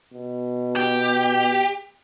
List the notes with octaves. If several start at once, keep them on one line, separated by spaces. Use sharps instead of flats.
B2
G4